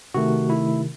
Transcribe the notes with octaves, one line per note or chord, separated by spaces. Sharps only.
C3 D#3 A3 F#4
E4